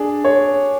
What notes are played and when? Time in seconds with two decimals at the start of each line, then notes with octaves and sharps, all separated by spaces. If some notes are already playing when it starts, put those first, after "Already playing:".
Already playing: D4 G#4
0.24 C#5